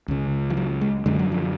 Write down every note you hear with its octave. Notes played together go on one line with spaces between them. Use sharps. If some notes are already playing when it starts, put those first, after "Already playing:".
C#2 C#3
F3
F#3
G#3
F#2 D3 G#3
F#3
F3